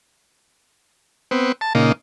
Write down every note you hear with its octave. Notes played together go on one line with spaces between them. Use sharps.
B3 C4
A5
A#2 C#3 A#3 D#4